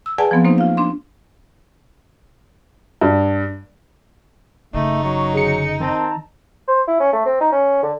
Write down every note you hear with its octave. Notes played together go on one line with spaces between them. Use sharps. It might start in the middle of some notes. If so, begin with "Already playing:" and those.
E6
G#4 B4 D5 F#5 G#5 A5
F3 F#3 B3 C4
A#3 C4 D#4 C5
F4 F5
D4 C6
G2
F#1 C#3 A3 D#4
F#3 C#6
D3 G#4 C#7
D#3 C4 A5 A#5
C5
E4
C#4
A3
C4
D#4
C#4
D3